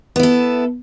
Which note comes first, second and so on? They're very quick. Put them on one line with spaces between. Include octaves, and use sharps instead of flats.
B3 E4 A4